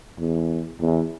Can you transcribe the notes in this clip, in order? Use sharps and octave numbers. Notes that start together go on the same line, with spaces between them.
E2
E2